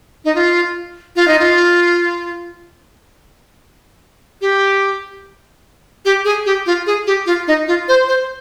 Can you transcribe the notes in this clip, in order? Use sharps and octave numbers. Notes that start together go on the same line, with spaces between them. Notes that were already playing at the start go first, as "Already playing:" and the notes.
D#4
F4
F4
D#4
F4
G4
G4
G#4
G4
F4
G#4
G4
F4
D#4
F4
C5
C5